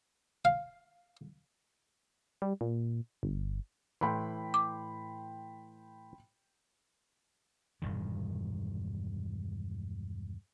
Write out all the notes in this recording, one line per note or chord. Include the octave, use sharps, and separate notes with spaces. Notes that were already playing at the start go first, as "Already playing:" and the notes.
F5
G3
A#2
G1
A2 E3 G5 B5 C6
D6
E1 G2 A#2 D#3